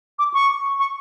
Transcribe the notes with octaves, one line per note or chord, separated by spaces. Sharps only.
D6
C#6
C#6